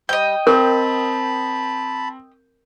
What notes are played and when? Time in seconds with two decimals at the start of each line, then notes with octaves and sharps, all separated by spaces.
0.09 G3 D#5 G5 G6
0.47 C4 A#4 A5 B5